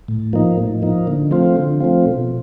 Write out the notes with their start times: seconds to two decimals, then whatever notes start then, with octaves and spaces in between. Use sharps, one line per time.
0.08 A2
0.33 F3 A#3 D#4
0.57 A2
0.82 F3 A#3 D#4
1.07 D3
1.31 F3 A3 C4 F4
1.57 D3
1.80 F3 A3 C4 F4
2.06 B2